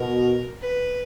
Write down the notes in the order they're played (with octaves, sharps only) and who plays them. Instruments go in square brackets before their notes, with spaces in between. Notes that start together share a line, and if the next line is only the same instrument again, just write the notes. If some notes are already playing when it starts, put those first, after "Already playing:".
Already playing: [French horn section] B2 [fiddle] A#4
[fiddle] B4